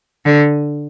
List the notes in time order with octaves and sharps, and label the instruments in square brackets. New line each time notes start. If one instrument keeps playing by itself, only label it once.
[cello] D3